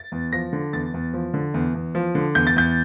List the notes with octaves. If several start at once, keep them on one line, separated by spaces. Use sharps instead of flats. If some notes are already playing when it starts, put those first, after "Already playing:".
Already playing: A6
E2
F3 A#6
D3
E2 A6
E2
F3
D3
E2
E2
F3
D3
E2 G6
A6
E2 G6